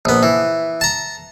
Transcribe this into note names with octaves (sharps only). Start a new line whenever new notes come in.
A#1 B3
E3
A5 A#5